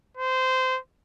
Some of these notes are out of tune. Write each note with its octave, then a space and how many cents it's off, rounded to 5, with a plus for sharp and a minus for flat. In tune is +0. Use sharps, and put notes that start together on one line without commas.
C5 -20